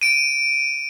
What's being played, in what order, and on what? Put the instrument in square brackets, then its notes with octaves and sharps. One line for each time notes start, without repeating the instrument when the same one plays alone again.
[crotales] D7 D#7